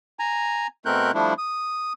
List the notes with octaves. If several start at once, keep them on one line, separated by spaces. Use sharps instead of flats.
G#5 A#5
B2 A3 C4 A#4 F#6 G6
F3 G3 A3 D4 E4
D#6